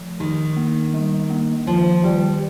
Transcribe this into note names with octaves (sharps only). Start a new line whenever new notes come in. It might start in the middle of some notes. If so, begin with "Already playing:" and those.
Already playing: F3
D#3 D#4
A#3
G3
A#3
D#3 F3
D#3 G3